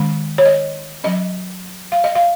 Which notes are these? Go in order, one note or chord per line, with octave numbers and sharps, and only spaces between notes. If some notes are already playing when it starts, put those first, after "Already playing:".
Already playing: D#3 G#3 C#4
C#5
D#5
F#3 C#4 D#5
F5
D#5
F5